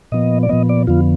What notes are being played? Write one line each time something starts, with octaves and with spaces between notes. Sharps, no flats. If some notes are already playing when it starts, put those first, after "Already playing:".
A#2 F3 B3 D#5
D5
A#2 F3 B3 D#5
D5
F2 D3 F3 B3 F4